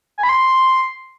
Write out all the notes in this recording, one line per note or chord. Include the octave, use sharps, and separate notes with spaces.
G#5
B5
C6